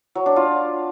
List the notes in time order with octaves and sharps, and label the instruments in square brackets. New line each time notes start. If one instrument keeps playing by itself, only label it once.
[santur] F#3
D4
F4